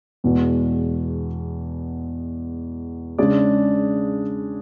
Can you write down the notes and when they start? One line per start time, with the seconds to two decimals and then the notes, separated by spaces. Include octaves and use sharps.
0.24 E2 B2 G#3
3.18 C#3 G#3 D4 G#4 D5